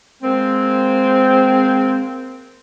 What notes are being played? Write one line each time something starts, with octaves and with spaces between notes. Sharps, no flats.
G#3 A#3 C4